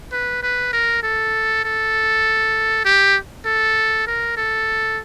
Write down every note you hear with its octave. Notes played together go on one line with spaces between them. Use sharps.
B4
B4
A#4
A4
A4
G4
A4
A#4
A4